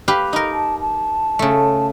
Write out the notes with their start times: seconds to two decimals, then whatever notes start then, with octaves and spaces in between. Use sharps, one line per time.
0.08 G4 B4 F5
0.33 D#4 A#4
0.53 A5
0.80 A5
1.39 C#3 A3